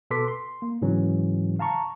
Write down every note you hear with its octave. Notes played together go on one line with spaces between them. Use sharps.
B2 A4 B4 C6 D6 B6
C6
A#3
G#2 C#3 E3 F#3 C#4
F5 A5 A#5 C#6